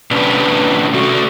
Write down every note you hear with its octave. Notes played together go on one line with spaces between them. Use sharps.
C3 C#4 D4 B4
A3 F#4